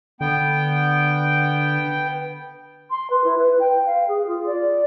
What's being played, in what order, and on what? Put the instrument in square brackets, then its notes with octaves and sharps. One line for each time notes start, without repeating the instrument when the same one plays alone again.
[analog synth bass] D3 [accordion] B3 G5
[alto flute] C6
B4
E4
B4
G5
F5
G#4
F4
D5